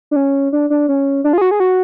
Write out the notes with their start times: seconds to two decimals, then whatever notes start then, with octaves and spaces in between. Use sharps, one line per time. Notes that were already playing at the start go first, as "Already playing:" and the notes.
0.11 D4
0.16 C#4
0.53 D4
0.70 D4
0.89 C#4
1.24 D4
1.33 F4
1.38 G#4
1.41 F#4
1.51 G#4
1.60 F#4